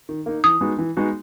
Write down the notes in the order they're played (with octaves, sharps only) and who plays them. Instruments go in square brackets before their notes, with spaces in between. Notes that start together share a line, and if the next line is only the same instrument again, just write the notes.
[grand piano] D#3
A#3 D#4
[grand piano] E3 [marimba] D#6
[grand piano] G#3 B3 D#4 F#4
E3
G#3 B3 D#4 F#4